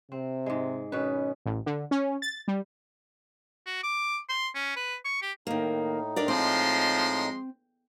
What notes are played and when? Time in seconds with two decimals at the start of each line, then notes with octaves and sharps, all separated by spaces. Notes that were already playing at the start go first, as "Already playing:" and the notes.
0.12 C3 C4
0.46 G#2 G#3
0.92 B2 D#3 C#4 B4
1.46 A1
1.66 D3
1.91 C#4
2.22 A6
2.48 G3
3.66 F#4
3.83 D6
4.29 C6
4.55 C#4
4.76 B4
5.05 C#6
5.22 G4
5.47 A2 D#3 A#3 D#4
6.16 D4 A#4 D5
6.28 F3 G#3 C4 C6